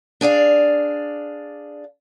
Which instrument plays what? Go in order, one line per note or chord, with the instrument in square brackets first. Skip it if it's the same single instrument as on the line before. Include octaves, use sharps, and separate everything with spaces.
[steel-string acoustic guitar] D4 G#4 D5 F5